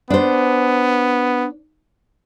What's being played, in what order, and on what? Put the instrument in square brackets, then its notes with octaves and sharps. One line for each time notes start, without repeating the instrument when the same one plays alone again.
[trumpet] B3 [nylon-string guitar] D4 C5